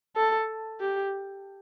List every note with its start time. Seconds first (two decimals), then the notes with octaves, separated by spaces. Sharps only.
0.16 A4
0.81 G4